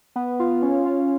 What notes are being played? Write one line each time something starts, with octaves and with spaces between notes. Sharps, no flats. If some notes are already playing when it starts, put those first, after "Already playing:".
B3
F4
C#4
F4